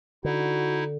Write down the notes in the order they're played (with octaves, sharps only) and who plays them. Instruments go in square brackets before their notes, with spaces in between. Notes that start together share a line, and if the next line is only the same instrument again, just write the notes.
[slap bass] D3 [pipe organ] D#4 E4 [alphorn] F#4